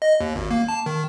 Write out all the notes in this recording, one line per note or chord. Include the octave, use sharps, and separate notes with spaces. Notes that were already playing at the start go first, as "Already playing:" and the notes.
D#5
D#2
G#1
A#3
A5
D#3